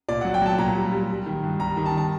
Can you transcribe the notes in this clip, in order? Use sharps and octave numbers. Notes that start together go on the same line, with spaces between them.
A#2 D5
F#3 F#5
G5
F#3 A5
A#2 A#5
G3
G3
G3
D#3
G2
G3 A#5
D#3
A5
A5